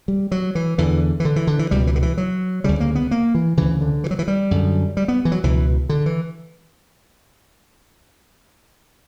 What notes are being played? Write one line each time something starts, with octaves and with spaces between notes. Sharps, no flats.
G3
F#3
E3
E2 D3 E3
E3
D3
E3
D3
E3
C#2 B2 G3
E3
D3
E3
F#3
D2 C#3 G3
A#3
B3
A#3
E3
D2 C#3 E3
D3
E3
F#3
E3
G3
F#2 D3
G3
B3
E3
F#3
C#2 B2 E3
D3
E3